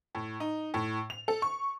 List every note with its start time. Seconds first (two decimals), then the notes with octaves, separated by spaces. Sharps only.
0.15 A2
0.40 D#4
0.74 A2
1.10 F7
1.28 A4
1.42 C#6